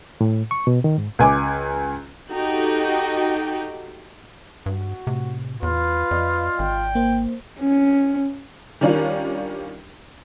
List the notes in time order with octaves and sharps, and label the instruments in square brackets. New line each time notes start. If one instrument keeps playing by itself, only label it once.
[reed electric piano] A2
C#6
B2
D#3
G#2
[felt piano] C#2 G#5 D6
[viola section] D#4 F#4 G4 A4 G5
[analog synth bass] G2 [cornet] F#4
[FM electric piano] A2 [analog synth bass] C3
[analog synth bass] E2 [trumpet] F4 [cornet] B4
[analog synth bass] F2 [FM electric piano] D5 D#5
[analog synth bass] G#1 [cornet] G5
[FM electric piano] A#3 C5
[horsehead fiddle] C#4
[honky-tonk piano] D#3 G3 C#4 D4 F4 A#4